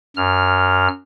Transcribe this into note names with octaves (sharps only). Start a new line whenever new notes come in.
F#2 F6